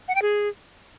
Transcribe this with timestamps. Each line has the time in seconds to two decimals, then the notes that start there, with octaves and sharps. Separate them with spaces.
0.08 F#5
0.15 G5
0.22 G#4